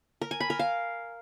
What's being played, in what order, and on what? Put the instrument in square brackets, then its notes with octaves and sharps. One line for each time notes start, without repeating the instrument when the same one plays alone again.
[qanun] A#4
G#5
B5
A#4
F5